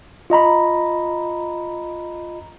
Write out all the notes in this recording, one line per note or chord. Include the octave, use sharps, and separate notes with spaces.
F4 D#5 A#5 B5